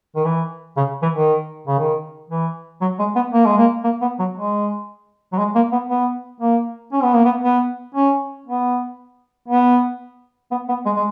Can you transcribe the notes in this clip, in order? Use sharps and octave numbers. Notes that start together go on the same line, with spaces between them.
D#3
E3
C#3
E3
D#3
C#3
D#3
E3
F#3
G#3
B3
A#3
G#3
A#3
A#3
B3
F#3
G#3
F#3
G#3
A#3
B3
B3
A#3
C#4
B3
A#3
B3
B3
C#4
B3
B3
B3
B3
G#3
G#3